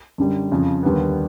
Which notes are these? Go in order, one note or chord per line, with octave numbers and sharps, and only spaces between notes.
F#2 D3 G3
F2 C#3 F3
D#2 D3 G3 B3